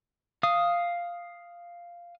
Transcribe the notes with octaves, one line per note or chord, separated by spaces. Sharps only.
F5 D#6